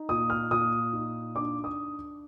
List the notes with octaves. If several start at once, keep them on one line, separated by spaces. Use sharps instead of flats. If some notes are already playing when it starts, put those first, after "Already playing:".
Already playing: D#4
A#2 D#6
F6
A#2 D#6
D#4
D4 D6
D#6